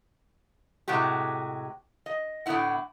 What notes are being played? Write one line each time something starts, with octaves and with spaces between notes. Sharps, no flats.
A2 C3 G#3 F#4 G4
D#5
A2 D3 B3 D#4 E4 F#5